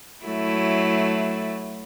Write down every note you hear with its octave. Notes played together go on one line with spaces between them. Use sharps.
F#3 A3 E4